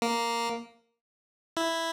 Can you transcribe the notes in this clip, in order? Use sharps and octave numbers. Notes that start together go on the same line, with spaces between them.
A#3
E4